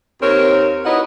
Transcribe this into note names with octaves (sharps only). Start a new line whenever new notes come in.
D#2 C4 A#4 C#5
D#4 E4 F#4 B4 C#5 D#5